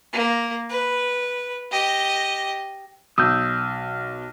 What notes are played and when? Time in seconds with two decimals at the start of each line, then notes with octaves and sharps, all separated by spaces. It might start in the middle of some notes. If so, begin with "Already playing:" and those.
0.13 A#3
0.70 B4
1.71 G4 D#5
3.18 B1 D#6 E6 G6